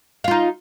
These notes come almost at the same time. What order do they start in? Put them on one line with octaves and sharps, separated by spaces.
F5 F4 D#4